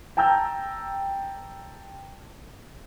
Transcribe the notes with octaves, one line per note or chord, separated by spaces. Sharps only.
G5 A5 A#5 E6 G6